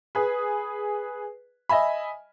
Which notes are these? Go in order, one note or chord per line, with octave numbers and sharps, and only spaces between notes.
G#4 B4
D#5 E5 G#5 B5